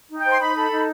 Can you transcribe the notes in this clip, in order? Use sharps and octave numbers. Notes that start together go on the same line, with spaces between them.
D#4
G5
C5 C6
D#4 B5
A4
D#4